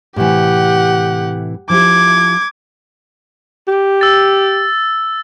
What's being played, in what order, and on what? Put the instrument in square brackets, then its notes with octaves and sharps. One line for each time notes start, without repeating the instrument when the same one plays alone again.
[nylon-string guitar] A2 C3 E3 [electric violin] G4 F#5
[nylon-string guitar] F3 E4 G4 [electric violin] D6 G#6
[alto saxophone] G4
[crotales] E6 A6